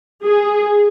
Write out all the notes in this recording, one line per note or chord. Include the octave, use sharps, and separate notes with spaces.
G#4